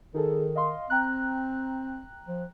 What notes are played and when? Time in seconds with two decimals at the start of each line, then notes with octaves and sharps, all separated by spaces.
0.14 D#3 D#4 G#4 A4
0.55 D#5 F5 C6
0.90 C4 G5 A#5 F#6
2.28 F3